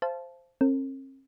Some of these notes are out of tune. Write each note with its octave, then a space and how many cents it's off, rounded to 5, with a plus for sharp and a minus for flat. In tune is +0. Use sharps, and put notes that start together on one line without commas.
C5 +0 F5 -35 A5 -20
C4 +45 A#4 -40